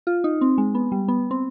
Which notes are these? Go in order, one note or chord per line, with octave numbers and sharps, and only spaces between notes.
F4
D#4
C4
G#3
B3
G3
B3
C4